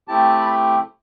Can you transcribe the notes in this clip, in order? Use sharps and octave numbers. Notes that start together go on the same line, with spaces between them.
A3 C4 E4 G4 A5
B5